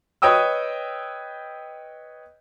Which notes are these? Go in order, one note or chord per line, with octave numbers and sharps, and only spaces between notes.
B4 C#5 D#5 G5 D#6 E6